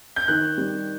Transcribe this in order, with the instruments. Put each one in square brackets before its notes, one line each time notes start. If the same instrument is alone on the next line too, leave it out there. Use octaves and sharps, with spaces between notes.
[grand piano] G6
D#3 F#6
G3